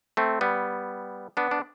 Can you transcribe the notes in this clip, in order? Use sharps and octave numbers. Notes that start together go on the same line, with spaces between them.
A3 C4
G3 B3
B3 D4
D4